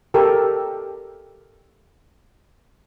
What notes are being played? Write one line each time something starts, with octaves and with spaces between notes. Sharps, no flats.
G4 A4 A#4